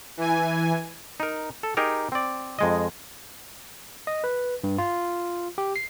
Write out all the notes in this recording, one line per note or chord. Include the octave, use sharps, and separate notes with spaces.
E3 G#5
D#4 A#4
A4
D#4 G4 G#4 A#4
C4 D5
F2 G#3 D#5
D#5
B4
G2
F4
G4
C7